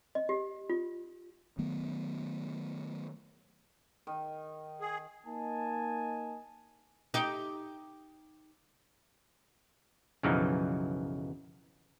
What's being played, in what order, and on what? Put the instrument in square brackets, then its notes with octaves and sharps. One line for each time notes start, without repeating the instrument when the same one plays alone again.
[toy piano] D#5
G4
F4
[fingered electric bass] D#3 F#3 A3 B3
[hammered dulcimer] D#3
[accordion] G#4
[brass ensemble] A#3 D#4 D#5 G#5 A5
[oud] D#4 G4
[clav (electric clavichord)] B1 F#2 C#3 E3 F3 D#4